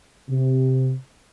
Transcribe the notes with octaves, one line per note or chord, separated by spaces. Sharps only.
C3